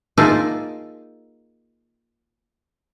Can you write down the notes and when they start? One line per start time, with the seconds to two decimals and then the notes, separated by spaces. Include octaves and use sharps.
0.17 A#3 D#4 F4 G#4 E5 A5